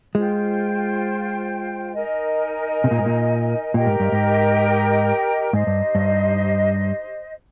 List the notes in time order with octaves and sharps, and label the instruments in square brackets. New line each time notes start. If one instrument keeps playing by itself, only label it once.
[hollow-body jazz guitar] G#3 [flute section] F4 C5 G5
[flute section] D#4 A#4 D#5 G#5
[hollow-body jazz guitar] C3
A#2
G#2
A#2
[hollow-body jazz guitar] A#2 [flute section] G4 A#4 D#5 G5
[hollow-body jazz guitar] G#2
G2
G#2
[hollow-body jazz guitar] G#2 [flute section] D#4 G4 C5 D#5
[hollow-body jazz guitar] G2
G2